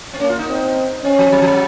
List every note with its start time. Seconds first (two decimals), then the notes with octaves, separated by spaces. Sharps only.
0.14 C4
0.20 A#3 C#4
0.30 F4
0.39 D#4
0.48 C4
1.04 C4 C#4
1.19 F3
1.32 F#3
1.42 F3
1.47 F#3